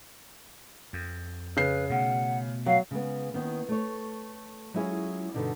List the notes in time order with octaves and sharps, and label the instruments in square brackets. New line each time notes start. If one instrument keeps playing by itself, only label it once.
[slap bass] F2
[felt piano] C#3 C7 [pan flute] B4
[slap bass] B2 A3 [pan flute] F#5
[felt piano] F#3 [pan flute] F5
[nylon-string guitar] C#3 G#3 B3
D#3 A#3 B3 C#4
A3 C#5
F#3 G#3 C#4 E4 F4 G#4
G2 B2 D3 D#4 D5